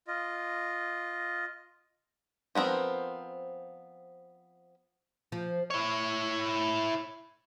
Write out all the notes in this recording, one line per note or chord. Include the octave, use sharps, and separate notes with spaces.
F4 D#5
F3 B3 C4 A#4
F3
E4 C#5